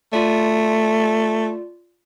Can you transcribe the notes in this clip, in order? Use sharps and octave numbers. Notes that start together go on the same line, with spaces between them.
A3 F4 D5